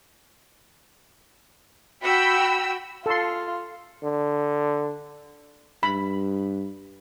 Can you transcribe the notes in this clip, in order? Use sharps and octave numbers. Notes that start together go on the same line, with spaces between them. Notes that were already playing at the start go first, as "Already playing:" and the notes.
F#4 G5 B5 E6
F4 A4 C6
D3
G2 B5